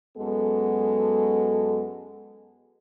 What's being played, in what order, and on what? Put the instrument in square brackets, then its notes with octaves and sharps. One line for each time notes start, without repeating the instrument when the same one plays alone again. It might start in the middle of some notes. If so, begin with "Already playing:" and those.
[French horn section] F#2 G#3 B3 F#4 A4